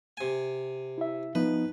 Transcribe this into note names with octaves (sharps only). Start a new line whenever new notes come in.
C3 G#5
E4 E5
F3 B3 D#4 B4